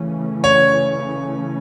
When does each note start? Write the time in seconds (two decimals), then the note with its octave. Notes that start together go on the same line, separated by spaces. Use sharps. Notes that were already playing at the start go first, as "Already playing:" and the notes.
Already playing: C#3 E3 A3 C#4
0.44 C#5